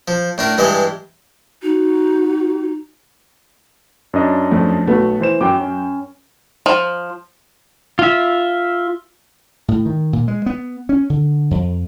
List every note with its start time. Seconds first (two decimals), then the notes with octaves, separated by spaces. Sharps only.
0.08 F3
0.38 A2 D4 A#4
0.58 G2 E3 G#3 D#5
1.63 D#4 F#4
4.14 F#2 D4 D#5
4.52 F2 A3
4.87 B1 A3 B3 F#4
5.21 E3 C5 E7
5.41 F#2 F#3 G5 D6
5.61 C#4
6.66 F3
7.99 F4 E5
9.68 A2
9.86 D#3
10.13 A#2
10.28 G#3
10.46 B3
10.89 C#4
11.10 D3
11.51 F2